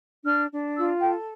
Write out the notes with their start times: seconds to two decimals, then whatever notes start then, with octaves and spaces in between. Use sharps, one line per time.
0.24 D4 F6
0.51 D4
0.76 F4 E6
1.02 A4 G5